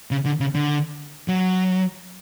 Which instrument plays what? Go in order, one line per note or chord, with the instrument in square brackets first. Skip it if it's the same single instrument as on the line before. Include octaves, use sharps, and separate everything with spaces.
[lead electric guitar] C#3
D3
C#3
D3
F#3